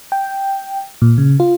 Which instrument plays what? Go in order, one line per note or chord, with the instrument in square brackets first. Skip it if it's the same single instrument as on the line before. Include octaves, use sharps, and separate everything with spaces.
[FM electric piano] G5
A#2
C#3
F4